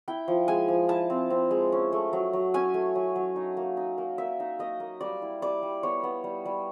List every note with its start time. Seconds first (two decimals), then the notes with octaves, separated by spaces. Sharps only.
0.08 E4 G5
0.28 F3
0.48 G#3 G#5
0.68 F3
0.89 E4 A5
1.10 C4
1.30 C4
1.51 G#3
1.72 C#4
1.92 A3
2.13 F#3
2.33 F#3
2.54 C#4 G#5
2.74 A3
2.95 F#3
3.16 F#3
3.36 D#4
3.57 A#3
3.77 D#4
3.98 A#3
4.18 A#3 E5
4.40 D#4
4.59 A#3 D#5
4.80 A#3
5.01 G3 D5
5.22 E4
5.42 G3 D5
5.62 G3
5.83 B3 C#5
6.03 B3
6.24 G3
6.46 G3